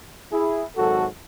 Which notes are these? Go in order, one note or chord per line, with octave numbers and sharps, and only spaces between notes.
E4 G#4
G#1 G#2 F#3 F#4 A4